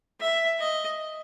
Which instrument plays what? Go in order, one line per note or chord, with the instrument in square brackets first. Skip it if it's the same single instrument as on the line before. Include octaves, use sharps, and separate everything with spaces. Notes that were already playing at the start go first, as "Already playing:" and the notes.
[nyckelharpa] E5
D#5